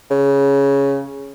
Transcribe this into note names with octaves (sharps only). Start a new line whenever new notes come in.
C#3